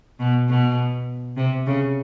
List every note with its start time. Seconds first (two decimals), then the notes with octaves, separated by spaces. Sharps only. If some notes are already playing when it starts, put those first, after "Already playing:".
0.19 B2
0.49 B2
1.37 C3
1.67 C#3